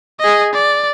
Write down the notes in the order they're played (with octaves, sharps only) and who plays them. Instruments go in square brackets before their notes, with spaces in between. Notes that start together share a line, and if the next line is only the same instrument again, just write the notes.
[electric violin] G#4 D#5
D5